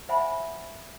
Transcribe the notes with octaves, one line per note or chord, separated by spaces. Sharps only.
C5 E5 F#5 G#5 B5